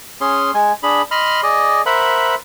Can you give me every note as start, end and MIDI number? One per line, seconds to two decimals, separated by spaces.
0.21 0.51 61
0.21 0.51 68
0.21 0.51 84
0.54 0.72 56
0.54 0.72 80
0.83 1.02 62
0.83 1.02 68
0.83 1.02 83
1.11 1.41 75
1.11 1.41 83
1.11 1.41 84
1.11 1.41 89
1.43 1.82 68
1.43 1.82 74
1.43 1.82 75
1.86 2.35 70
1.86 2.35 72
1.86 2.35 76
1.86 2.35 78
1.86 2.35 83